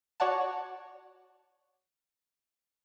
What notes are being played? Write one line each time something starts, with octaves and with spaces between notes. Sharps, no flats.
F#4 C#5 D5 F#5 A5